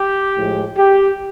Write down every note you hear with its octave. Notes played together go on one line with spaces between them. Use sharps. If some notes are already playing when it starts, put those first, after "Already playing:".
Already playing: G4
A2 F3 G#3
G4